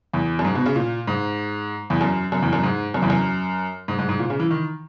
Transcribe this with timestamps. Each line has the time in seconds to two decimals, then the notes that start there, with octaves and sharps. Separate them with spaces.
0.14 E2
0.39 F#2
0.45 G#2
0.55 B2
0.66 C#3
0.76 A#2
1.07 G#2
1.90 E2
2.01 F#2
2.32 F#2
2.42 E2
2.53 F#2
2.63 G#2
2.94 F#2
3.02 E2
3.10 F#2
3.88 G#2
3.99 G#2
4.09 G#2
4.19 A#2
4.30 C#3
4.40 E3
4.51 D#3